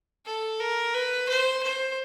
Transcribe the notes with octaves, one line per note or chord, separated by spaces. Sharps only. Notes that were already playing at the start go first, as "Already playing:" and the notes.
A4
A#4
B4
C5
C5